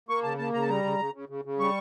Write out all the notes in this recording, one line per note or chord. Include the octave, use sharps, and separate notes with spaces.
A#3 C#6
C#3 A5
A#3 A5
C#3 A#5
A5
G3 A#5
C#3
C#3
C#3
C#3
C#3
G3 C#6